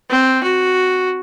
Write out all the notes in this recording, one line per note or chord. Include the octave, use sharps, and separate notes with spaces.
C4
F#4